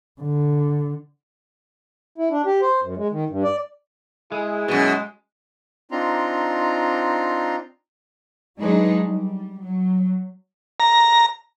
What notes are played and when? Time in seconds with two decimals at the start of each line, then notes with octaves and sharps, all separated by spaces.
0.21 D3
2.18 E4
2.31 D4
2.46 G4
2.62 C5
2.83 F#2
2.97 G#3
3.12 D#3
3.30 G2
3.44 D5
4.32 G#3 E4 G#4
4.68 F#2 B2 G#3
5.91 C4 D4 D#4 F4 A#5 C6
8.59 F#3 G#3 D4 D#4 G#4 B4
9.04 G3
9.62 F#3
10.80 A#5